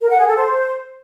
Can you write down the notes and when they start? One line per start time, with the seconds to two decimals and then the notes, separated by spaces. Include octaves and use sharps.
0.01 A#4
0.09 F#5
0.18 G#4
0.27 A4
0.36 C5